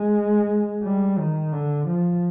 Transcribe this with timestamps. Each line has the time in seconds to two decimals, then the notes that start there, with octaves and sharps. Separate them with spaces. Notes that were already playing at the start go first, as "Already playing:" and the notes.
Already playing: G#3
0.83 G3
1.18 D#3
1.53 D3
1.88 F3